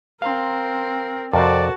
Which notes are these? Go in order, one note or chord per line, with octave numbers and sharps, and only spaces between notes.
C4 A#4 F5 A#5 C6
F2 C3 F#4 A4 A#4 C5 D5 A5